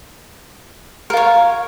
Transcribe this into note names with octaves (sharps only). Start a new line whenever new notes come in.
F4 A#4 C#5